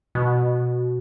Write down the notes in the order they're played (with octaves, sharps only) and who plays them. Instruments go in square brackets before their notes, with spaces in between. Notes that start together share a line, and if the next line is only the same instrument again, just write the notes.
[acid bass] B2